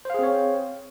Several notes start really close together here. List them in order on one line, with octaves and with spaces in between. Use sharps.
C5 F5 G#4 C4 C#5